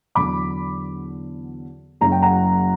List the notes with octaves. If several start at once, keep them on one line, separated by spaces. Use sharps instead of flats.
E2 D3 F#3 B5 D6
F#1 F#2 C#3 F#3 A#5
G5
F#5 A#5